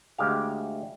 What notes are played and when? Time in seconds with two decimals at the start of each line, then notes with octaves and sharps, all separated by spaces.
0.18 D2 G#3 G4 F5